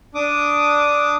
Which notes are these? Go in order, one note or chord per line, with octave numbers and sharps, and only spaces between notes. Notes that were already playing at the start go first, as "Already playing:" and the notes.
D4 D6 D#6